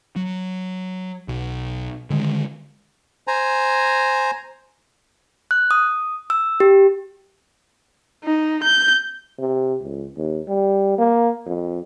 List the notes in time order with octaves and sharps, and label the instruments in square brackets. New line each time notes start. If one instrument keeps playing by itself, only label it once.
[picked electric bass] F#3
B1
D3 D#3 G3 G#3
[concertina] C5 G#5 A#5
[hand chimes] F#6
D#6
E6
G4
[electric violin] D#4
G6
[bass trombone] C3
C#2
D#2
G3
A#3
F2